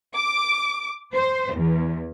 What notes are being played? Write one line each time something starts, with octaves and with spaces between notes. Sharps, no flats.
D6
C5
E2